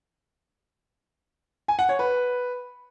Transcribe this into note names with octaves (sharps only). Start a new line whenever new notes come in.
G#5
F#5
C#5
B4